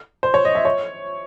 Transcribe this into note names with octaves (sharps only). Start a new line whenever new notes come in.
C5
C#5
D#5
E5
C#5